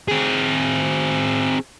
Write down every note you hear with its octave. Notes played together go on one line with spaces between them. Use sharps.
C4 G#4